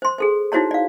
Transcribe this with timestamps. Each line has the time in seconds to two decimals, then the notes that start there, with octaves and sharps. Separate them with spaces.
0.02 C5 C6
0.18 G#4 A4 C5
0.52 D#4 E4 F#4 C5 C#5 A#5
0.71 D5 F5